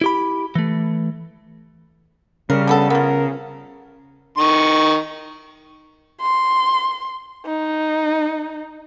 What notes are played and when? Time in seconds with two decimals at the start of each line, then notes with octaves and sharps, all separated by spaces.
0.01 E4 G4 B5
0.55 E3 A3
2.50 C#3 G3 A#4
2.67 D3 B3 A4
2.90 F3 B3 A#4
4.38 D#3 C#6
6.21 C6
7.46 D#4